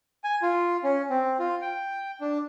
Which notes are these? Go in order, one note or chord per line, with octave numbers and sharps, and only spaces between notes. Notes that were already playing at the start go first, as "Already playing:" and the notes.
G#5
F4
C#4
C4
F4
G5
D4